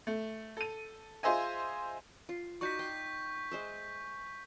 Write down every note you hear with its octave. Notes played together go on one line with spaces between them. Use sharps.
A3
A4 D#7
F4 G#4 C5 D#5 E5 G#5
F4
D#4 F#4 D5 C#6 G6 B6
F5 G5
G#3 C5 E5